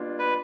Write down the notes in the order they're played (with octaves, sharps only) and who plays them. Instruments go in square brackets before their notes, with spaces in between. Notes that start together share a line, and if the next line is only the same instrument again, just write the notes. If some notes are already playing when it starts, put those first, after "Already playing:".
Already playing: [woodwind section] B2 G3 A#3 D4 F4
[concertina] B4